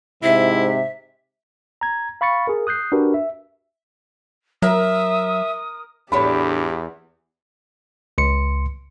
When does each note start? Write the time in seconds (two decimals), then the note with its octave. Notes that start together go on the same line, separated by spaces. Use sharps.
0.23 G#2 C3 E4 E5
1.81 A#5 G#6
2.21 F5 B5 C#6 A6 C#7
2.47 G#4 A#4
2.67 D#6 F#6 G6 C7
2.92 D4 F#4 G4 A#4 B4
3.14 E5
4.62 F#3 A#4 E5 D#6
6.12 E2 A2 D4 G4 C#5 B5
8.18 C#2 C6 C#7